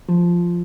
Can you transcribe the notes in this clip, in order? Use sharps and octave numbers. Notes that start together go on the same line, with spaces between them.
F3